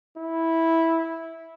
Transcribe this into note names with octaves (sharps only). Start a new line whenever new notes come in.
E4